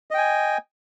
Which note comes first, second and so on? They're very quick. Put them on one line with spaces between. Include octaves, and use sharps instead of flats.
D#5 G5 G#5